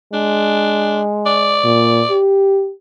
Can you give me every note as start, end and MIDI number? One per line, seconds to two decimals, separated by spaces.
0.13 1.77 56
0.13 1.01 62
1.26 2.18 74
1.64 2.02 46
2.11 2.71 67